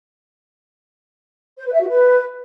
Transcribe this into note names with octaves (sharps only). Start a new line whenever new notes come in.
C5
B4
E5
F#4
B4